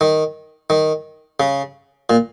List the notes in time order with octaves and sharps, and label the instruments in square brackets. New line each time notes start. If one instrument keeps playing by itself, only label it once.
[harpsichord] D#3
D#3
C#3
A#2